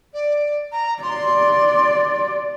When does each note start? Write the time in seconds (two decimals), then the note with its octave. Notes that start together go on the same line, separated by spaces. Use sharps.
0.13 D5
0.72 A#5
1.03 D5 C6